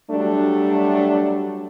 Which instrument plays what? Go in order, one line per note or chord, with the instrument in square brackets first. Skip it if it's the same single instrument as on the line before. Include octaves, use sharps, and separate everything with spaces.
[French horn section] F#3 G3 A3 D4